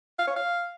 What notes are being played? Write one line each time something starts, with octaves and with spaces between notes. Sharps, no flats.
F5
C#5
F5